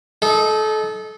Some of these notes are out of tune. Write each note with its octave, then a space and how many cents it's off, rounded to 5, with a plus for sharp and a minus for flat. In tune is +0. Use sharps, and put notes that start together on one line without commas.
D#4 +0 A4 -30